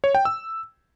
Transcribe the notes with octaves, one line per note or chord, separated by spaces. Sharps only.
C#5
G5
E6